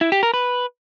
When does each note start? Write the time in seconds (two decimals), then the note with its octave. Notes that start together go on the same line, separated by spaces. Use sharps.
0.01 E4
0.12 G4
0.23 A#4
0.34 B4